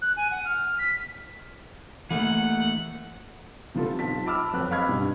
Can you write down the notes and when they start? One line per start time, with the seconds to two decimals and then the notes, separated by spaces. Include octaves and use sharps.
0.02 F#6
0.17 G#5
0.31 F#5
0.45 F6
0.79 B6
2.11 E3 A3 A#3 F#5
3.75 C3 E3 B3 F4 G4 A4
3.99 B1 F4 A5 B6
4.26 A5 B5 D6 E6 F6
4.53 F2 F#3 B4 F#6
4.71 D#5 F5 B5 F6 G#6
4.89 G2 B2 G3